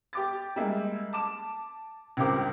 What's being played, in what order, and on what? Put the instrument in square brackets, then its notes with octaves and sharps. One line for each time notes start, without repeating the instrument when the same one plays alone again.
[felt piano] G4 D6 A6
G3 G#3 A#3 E5
A5 D6 E7
C#2 G2 C4 G4 A#4 D6